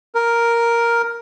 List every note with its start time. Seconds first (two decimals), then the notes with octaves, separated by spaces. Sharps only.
0.15 A#4